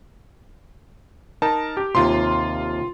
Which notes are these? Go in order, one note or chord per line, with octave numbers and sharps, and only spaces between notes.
D#4 A#4 A5
G4
D#2 C3 F4 C6